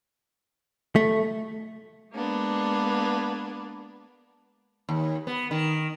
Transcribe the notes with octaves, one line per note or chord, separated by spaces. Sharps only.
A3
G#3 A#3 B3 D4
D#2
B3
D#3